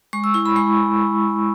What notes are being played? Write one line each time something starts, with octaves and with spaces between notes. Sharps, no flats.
G#3 C#6
E6
E4 C#6
B5
G#3 C#6